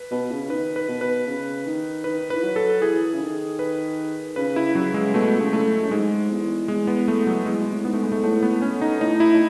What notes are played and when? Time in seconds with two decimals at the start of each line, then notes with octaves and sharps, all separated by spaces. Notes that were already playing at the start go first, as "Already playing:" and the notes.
Already playing: B4
0.11 B2 B4
0.31 C#3
0.50 D#3 B4
0.76 B4
0.88 B2
1.01 B4
1.27 C#3
1.66 D#3
2.04 D#3 B4
2.30 E3 B4
2.43 F#3
2.56 A4
2.81 E3 G#4
3.13 C#3
3.21 D#3
3.59 B4
4.36 C#3 B4
4.56 E4
4.75 C#3 F#3
4.94 G#3
5.14 B2 A3
5.39 C#3
5.53 A3
5.82 F#2
5.91 G#2 G#3
6.31 E2
6.68 E2 G#3
6.87 B3
7.08 A3
7.27 F#3
7.46 E2 G#3
7.61 B2
7.72 A2
7.85 G#2 B3
7.93 A3
8.03 G#3
8.12 A3
8.23 A2 A3
8.43 B3
8.62 C#4
8.81 D#4
9.01 A2 D#4
9.20 E4
9.34 A2